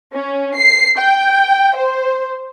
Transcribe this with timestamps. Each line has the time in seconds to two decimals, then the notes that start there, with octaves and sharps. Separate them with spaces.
0.14 C#4
0.57 C7
0.97 G5
1.76 C5